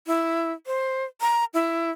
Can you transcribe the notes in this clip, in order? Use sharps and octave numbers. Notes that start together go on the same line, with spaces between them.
E4
C5
A#5
E4